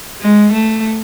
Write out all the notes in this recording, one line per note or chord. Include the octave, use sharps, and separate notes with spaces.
G#3
A3